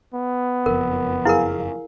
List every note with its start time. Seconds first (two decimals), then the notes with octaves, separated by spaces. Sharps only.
0.14 B3
0.66 F#1 F2 A#4
1.25 E4 G#4 A#4 F5